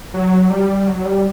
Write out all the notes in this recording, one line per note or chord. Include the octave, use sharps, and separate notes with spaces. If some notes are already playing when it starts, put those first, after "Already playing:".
F#3
G3
F#3
G3